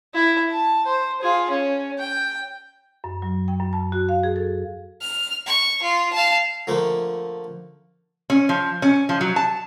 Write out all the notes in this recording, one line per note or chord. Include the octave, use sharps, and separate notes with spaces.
E4
A5
C5
F4 G#4
C#4
G5
F#2
F#3
G5
F#2
A5
F#4
F5
G#4
A4
F6
C#6
F4
F5 A5
D3 F3 A3 A#3
C#4
F3
C#4
F3
F#3
A5